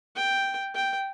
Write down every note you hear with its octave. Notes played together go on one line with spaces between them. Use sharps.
G5
G5